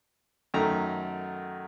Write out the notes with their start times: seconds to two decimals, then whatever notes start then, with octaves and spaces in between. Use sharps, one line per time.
0.54 F#2 D#3 A3 A#5